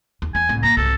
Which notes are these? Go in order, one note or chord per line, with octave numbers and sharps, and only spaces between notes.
D#2
E2 G#5
C2 A2
F#2 A#3 A#5
C2 G#2 A4